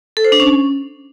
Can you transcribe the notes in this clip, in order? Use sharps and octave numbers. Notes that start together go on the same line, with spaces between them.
A4
C5
D4
C#4